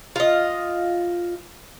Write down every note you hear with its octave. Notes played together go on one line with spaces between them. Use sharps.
F4 D#5